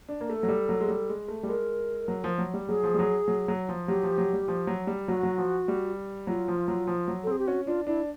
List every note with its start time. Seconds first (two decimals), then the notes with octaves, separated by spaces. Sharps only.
0.09 D4
0.21 A#3
0.29 A3 A4
0.43 F#3
0.48 G3
0.69 F#3
0.81 G#3
0.88 G3
1.09 G#3
1.28 A3
1.43 G3
1.48 G#3 A#4
2.08 F#3
2.24 F3
2.38 F#3
2.54 G3
2.68 F#3 G#4
2.83 F3
2.94 G3
2.99 F#3
3.28 F#3
3.48 F#3
3.69 F3
3.88 F#3 G4
4.03 F3
4.18 F#3
4.33 G3
4.48 F3
4.67 F#3
4.87 G3
5.08 F#3 F#4
5.23 F#3
5.38 F3
5.68 G3
6.27 F#3 F4
6.48 F3
6.68 F#3
6.87 F3
7.08 F#3
7.24 A4
7.27 C4 G#4
7.39 G4
7.47 C#4 F#4
7.67 D4 F4
7.87 D4 E4